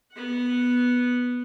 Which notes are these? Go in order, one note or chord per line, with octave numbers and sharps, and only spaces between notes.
B3 F#5